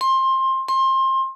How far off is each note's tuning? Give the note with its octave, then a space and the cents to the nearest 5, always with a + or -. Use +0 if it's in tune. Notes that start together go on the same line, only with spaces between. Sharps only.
C6 +20
C6 +25